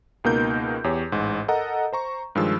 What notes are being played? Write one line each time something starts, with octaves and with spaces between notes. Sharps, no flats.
C#2 B2 A#3 D#4 A#4 G6
E2 G4 C#5
A1 G#2
A4 A#4 D#5 F#5 A#5
C5 A#5 C#6
G2 D#3 F3 G#3 E6